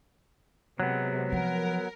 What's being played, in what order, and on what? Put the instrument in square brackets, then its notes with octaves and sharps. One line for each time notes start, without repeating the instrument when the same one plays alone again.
[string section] C3 G#3 [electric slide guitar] F#3 B3
[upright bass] F3 [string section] A#4